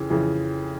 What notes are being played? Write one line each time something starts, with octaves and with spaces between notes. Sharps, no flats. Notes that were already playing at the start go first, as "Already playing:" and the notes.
Already playing: F2 C#3 E3
F2 C#3 E3